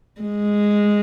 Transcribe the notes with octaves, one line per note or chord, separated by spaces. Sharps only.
G#3